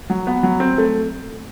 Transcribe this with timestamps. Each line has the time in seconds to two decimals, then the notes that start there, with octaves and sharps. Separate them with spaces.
0.10 F#3
0.27 B3
0.43 F#3
0.60 C4
0.78 A3